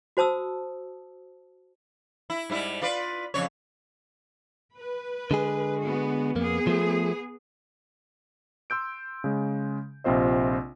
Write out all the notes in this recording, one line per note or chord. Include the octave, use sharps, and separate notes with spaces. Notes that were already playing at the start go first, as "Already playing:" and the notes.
F#4 C5 A5 D#6 E6
E4
G#2 G3 E4
F4 B4 D5
F2 C#3 C#5
B4
D3 G#3 G#4
B3 F#4
F2 A#3 B3 G#4
F3 A3
C6 E6 G6 D7
C#3 G#3
A#1 C3 C4 F4 C5 D#5